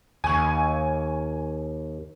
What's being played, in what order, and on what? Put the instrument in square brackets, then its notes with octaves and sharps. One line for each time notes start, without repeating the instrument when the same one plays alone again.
[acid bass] D#2 [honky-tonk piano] G#5 C#6